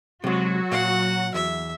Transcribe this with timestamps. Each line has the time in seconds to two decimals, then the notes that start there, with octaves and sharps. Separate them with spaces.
0.24 C3 F#3 G#3 F#4
0.71 A#2 F5 F#5
1.34 E2 E5